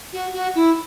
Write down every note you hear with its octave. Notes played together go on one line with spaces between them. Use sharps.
F#4
F#4
E4